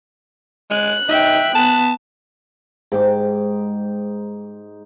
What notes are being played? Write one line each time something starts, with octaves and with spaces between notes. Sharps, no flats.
G#3 F#6
D#4 E5 G5
B3 A5
G#2 G5 D6